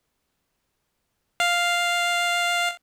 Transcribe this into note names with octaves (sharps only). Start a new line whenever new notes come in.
F5